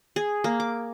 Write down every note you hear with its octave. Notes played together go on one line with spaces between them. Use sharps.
G#4
A#3
D6